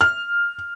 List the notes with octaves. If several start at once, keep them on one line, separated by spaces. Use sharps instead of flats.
F6